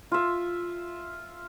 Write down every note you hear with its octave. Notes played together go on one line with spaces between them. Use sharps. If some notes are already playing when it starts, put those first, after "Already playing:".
F4 E5